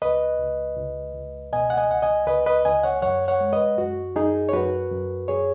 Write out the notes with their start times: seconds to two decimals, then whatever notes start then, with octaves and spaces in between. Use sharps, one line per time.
0.02 C#2 B4 D#5
0.40 C#2
0.77 C#2
1.14 C#2
1.53 B2 D#5 G#5
1.70 F#5
1.77 D#5 G#5
1.90 C#2 F#5
2.02 D#5 G#5
2.27 C#2 B4 D#5
2.46 B4 D#5
2.65 C#2 D#5 G#5
2.83 C#5 F#5
3.02 F#2 C#5 F#5
3.28 C#5 F#5
3.41 G#3
3.53 B4 D#5
3.78 F#2 F#4
4.15 F#2 D#4 G#4
4.49 C#5
4.53 F#2 F#4 B4
4.91 F#2
5.28 F#2 G#4 C#5